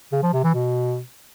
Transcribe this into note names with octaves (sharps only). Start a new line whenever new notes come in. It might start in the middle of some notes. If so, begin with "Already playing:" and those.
C#3
F3
C3
E3
B2